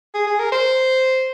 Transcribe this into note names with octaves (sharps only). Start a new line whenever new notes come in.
G#4
G#4
A#4
C5